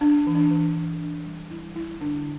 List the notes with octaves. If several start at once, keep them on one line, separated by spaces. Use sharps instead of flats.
D4
E3
D4
E3
E3
D4
G3
G3 E4
G3 E4
D3 D4